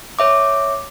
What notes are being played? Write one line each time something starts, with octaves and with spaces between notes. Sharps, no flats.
C#5 E5 D6